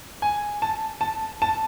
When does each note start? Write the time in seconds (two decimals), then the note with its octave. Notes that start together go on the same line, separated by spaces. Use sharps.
0.22 G#5
0.62 A5
1.01 A5
1.42 A5